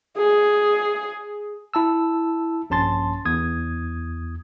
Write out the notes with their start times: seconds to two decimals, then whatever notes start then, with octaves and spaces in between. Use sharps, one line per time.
0.17 G#4
1.74 E4 A5 E6
2.70 A#1 G2 C#4 A5 C6 A6
3.25 E2 D#6 G#6